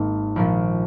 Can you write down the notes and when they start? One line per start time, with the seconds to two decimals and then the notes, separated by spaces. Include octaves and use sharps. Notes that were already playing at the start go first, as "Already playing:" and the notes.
Already playing: G#1 G#2 D#3 A#3
0.36 A#1 A#2 F3